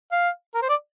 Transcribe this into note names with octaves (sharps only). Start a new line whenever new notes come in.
F5
A#4
C5
D5